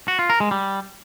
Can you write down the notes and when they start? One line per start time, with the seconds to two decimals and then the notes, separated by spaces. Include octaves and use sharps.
0.08 F#4
0.19 F4
0.30 A#4
0.40 G#3
0.51 G3